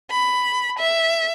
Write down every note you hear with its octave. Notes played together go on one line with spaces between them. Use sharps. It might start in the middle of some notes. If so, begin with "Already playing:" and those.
B5
E5